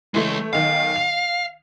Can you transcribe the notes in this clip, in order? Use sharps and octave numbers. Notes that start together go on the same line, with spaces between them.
C#3 E3 G#3 A3
B1 D#3 F5
F7